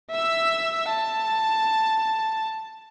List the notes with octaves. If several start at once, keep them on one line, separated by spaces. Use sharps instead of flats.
E5 E6
A5